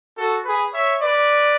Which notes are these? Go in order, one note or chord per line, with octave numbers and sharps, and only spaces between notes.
F#4 A4
G#4 B4
C#5 E5
B4 D5